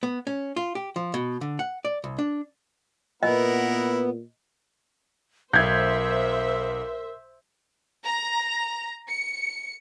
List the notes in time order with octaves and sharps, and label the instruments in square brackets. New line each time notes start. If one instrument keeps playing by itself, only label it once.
[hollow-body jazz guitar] B3
C#4
F4
G4
F3
B2
D3
F#5
D5
C2
D4
[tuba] A#2 [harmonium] B3 [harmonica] E4 A#4 F#5 [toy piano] D#5
[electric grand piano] B1 [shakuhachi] A#4 [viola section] C5 E5 [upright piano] G6 G#6
[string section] A#5
C#7